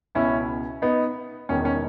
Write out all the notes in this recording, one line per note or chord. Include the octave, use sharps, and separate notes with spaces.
C#2 B2 C#4 E4
B3 D#4
E1 E2 D#3 C#4
C#4